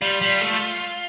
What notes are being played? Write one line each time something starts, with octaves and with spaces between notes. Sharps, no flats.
G3 F4
G3
A3